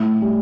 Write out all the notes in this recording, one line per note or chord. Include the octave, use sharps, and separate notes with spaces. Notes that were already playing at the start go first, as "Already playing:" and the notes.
Already playing: A2
G3